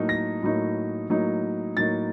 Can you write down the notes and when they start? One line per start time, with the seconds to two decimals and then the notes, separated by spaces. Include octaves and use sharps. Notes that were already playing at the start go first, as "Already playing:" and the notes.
Already playing: A2 F#3 A#3 D#4
0.09 A#6
0.43 A2 F#3 A#3 D#4
1.10 A2 F#3 A#3 D#4
1.77 A2 F#3 A#3 D#4 A6